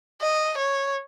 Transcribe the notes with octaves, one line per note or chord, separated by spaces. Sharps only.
D#5
C#5